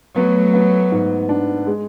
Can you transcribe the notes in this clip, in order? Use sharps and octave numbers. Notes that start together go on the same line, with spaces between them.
F#3 A3 B3
B3
G#2
D4
G#3